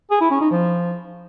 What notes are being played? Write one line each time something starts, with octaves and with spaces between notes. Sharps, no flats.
G#4
E4
C#4
D#4
F3